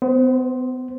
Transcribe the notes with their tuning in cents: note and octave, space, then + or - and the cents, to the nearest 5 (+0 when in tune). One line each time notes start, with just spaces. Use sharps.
B3 +40 C5 +0